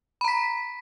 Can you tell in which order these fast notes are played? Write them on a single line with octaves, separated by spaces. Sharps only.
B5 A#5 B6